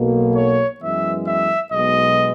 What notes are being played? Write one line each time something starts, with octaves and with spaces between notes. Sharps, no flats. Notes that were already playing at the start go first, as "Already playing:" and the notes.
Already playing: B1 B2 A#3
C#5
F#2 E3 G#3 B3 E5
E5
B1 B2 G#3 B3 D#5